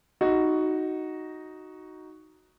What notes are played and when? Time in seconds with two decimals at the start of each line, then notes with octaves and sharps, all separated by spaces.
0.21 D#4 F#4